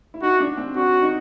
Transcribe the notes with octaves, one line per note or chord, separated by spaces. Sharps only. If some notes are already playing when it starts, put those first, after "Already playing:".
E4
D#4 F#4
D4
C4
D4 F#4
D#4